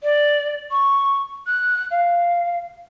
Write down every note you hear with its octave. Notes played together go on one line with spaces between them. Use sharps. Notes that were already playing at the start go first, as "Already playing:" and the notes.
D5
C#6
F#6
F5